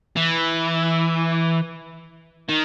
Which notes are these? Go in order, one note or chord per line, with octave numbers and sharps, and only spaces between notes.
E3
D#3